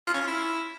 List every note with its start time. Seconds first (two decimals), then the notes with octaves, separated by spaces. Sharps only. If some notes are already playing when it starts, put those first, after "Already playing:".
0.07 F4
0.14 C#4
0.21 F4
0.28 E4